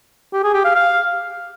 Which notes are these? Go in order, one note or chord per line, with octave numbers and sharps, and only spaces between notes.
G4
G#4
G4
F5
F5